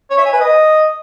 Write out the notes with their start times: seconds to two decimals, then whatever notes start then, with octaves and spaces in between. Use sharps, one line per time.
0.10 C#5
0.18 E5
0.25 G#5
0.33 B4
0.41 D#5